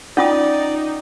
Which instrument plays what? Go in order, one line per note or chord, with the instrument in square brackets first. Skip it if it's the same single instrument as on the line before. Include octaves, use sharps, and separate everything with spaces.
[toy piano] C#4 F4 D#6 [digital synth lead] D#4 [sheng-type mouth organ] D5 [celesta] F#5 G5